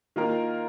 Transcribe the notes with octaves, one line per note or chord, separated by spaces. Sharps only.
D#3 A#3 F4 A#4 F5